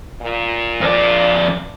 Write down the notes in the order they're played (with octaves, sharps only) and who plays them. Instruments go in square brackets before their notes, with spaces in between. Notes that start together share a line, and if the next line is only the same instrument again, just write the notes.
[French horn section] A#2
[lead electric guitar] F2 D5